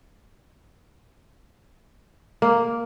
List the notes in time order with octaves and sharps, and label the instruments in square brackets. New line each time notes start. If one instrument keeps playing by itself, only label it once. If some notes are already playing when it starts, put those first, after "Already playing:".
[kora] A#3